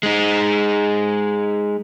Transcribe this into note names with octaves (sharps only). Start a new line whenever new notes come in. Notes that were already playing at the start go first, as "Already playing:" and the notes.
G#3 D#4